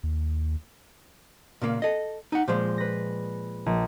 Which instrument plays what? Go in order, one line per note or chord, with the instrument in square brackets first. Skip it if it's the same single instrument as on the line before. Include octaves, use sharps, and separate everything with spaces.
[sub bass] D#2
[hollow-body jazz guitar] A#2 C#3 A#3
A4 D#5
D#4 F#5
[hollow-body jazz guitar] A#2 F3 G#3 [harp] C5
[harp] B4 A#6
A#1